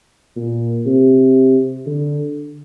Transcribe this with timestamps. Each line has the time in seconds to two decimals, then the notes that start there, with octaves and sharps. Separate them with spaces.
0.37 A#2
0.86 C3
1.87 D3